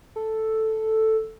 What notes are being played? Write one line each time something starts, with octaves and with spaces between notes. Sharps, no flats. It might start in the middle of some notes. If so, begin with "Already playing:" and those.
A4